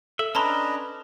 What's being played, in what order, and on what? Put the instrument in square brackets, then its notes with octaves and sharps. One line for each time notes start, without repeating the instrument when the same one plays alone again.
[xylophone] A4 [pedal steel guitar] E5
[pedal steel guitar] C#4 D4 [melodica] B4 D#5 [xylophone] A5 A#5 C6